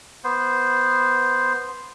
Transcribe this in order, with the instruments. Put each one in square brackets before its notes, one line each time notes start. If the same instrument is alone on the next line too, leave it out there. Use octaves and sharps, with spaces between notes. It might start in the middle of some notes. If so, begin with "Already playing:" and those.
[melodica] B3 C5